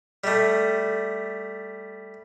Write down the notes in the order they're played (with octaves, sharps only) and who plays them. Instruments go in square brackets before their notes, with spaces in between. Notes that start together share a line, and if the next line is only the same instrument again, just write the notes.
[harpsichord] G3 A3